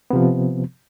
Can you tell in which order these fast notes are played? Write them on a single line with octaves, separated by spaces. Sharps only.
B3 C3 F3